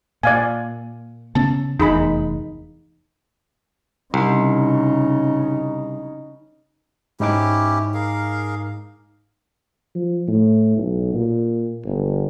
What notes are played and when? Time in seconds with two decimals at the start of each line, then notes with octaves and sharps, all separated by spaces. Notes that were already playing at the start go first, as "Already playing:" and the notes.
0.23 A#2 D5 F5 G#5
1.35 C#3 B3 C#4 A5
1.80 F1 E2 D#4 G#4 B5
4.14 C2 C#3 D#4
7.20 G#2 C#4 D#4 E4 G4 D6
7.94 G#4 A#4 F5
9.95 F3
10.28 A2
10.77 B1
11.14 A#2
11.85 G1